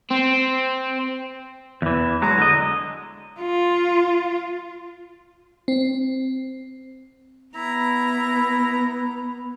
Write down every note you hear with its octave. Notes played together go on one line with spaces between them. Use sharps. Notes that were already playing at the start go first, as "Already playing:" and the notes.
C4
E2 E3
F#3 G#3 A#5
D3 D#5
F4
C4
B3 E4 A#5 B5